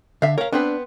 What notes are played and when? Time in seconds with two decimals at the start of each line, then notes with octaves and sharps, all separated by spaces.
0.22 D3 E5 F5
0.38 A#4 C#5 F5
0.53 B3 C4 D4 B4